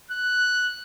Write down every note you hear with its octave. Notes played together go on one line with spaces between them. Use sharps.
F#6